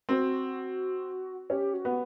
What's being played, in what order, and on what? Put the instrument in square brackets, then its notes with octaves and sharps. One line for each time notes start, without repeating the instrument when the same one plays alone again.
[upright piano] C4 [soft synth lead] F#4
[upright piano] C#4 [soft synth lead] G4
[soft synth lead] F#4
[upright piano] B3